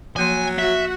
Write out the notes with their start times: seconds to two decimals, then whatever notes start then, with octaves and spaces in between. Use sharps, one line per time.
0.16 F3 F#3 A#3 G#5 C6
0.59 F#4 E5 F#5